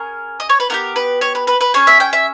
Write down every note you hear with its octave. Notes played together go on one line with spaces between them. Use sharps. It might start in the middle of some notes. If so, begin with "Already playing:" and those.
Already playing: C#4 G#4 A#4
D#5
C#5
B4
B3 E4 G4 A#4
B4
C#5
B4
B4
B4
C#4 G#4 C#5
E5
G5
E5